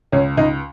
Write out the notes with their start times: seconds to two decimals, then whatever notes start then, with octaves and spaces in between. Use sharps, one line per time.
0.12 C#2 C#4
0.37 C#2 D#4